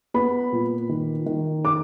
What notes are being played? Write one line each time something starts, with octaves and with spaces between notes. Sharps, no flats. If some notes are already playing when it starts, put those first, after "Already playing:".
B3 B5
A#2
D#3
D#3
D6